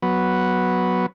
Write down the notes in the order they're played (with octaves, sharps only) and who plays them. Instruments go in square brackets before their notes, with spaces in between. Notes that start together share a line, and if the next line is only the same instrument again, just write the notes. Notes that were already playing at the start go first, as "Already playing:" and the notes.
[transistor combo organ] F#3 B3